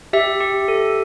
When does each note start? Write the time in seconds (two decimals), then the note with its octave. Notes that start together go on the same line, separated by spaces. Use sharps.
0.13 G4 E5
0.40 G4
0.68 A4